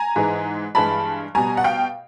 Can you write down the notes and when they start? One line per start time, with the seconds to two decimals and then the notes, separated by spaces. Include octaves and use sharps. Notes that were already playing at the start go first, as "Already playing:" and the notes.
Already playing: G#5 A#5
0.16 G#2 E3 G#3
0.75 G2 E3 G#3 A5 B5
1.35 B2 G3 G#5 A#5
1.57 F#5
1.64 F5 G5